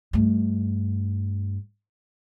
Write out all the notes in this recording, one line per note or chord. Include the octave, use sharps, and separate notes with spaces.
G2 A3